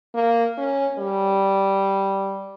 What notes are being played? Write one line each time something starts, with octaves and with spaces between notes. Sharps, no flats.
A#3
C#4
G3